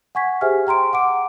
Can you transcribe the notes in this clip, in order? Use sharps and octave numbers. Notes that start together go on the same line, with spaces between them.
F#5 G#5 C#6 G#6 B6
G4 G#4 C5 E5 G#5 F6
G5 A#5 C6 D7
F#5 D6 D7